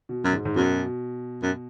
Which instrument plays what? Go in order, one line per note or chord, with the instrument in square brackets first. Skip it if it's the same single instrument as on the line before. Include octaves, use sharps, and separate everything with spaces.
[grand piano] B2
[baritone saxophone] F#2
[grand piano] G#2
G#2
[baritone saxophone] F#2 [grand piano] B2
[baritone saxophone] F#2